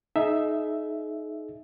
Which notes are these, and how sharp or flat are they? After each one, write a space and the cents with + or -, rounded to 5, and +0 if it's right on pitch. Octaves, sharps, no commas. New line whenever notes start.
D#4 +0 G#4 +40 E5 +0